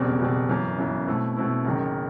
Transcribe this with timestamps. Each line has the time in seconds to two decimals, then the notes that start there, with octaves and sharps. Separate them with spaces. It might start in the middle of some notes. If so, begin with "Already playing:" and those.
Already playing: F#1 E2 B2 G3 C4
0.19 F#1 E2 B2 G3 C4
0.49 G1 F#2 E3
0.78 G1 F#2 E3
1.07 B2 A3 C4 E4
1.36 B2 A3 C4 E4
1.65 F#1 F#2 D#3